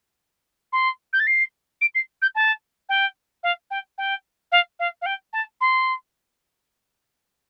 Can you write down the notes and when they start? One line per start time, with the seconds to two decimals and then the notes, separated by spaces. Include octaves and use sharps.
0.72 C6
1.13 G6
1.19 A6
1.27 C7
1.81 D7
1.95 C7
2.22 G6
2.35 A5
2.89 G5
3.43 F5
3.70 G5
3.98 G5
4.52 F5
4.79 F5
5.01 F5
5.06 G5
5.33 A5
5.61 C6